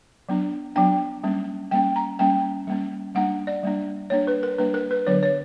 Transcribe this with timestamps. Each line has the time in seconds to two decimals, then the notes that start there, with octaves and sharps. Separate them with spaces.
0.29 F#3 B3 D4
0.75 F#3 B3 D4 G5
1.24 G3 A#3 C#4
1.71 G3 A#3 C#4 G5
1.96 A#5
2.19 G3 A#3 C#4 G5
2.67 G3 A#3 C#4
3.15 G3 A#3 D4 F#5
3.47 D5
3.63 G3 A#3 D4
4.10 G3 A#3 D4 C#5
4.27 B4
4.43 A#4
4.58 G3 A#3 D4 B4
4.74 A#4
4.91 B4
5.07 D3 F#3 B3 D4 C#5
5.23 C#5